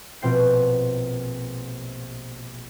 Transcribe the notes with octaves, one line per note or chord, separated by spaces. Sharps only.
A#1 B2 C4 G5 C7